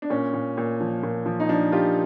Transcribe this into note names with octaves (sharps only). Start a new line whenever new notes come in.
D4
A#2 C#4
A#2
A#2
F3
A#2
F3
D#4
F3 D4
F3 F4 G4